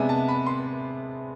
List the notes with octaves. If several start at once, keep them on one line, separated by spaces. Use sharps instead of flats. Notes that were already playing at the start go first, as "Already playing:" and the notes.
Already playing: C3 G#3 B3 D4 E5 G#5
A5
B5
C6